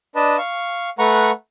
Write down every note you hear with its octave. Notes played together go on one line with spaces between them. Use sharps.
D4 B4 D#5 A5
F5 C#6
A3 B4 F#5 A#5 C#6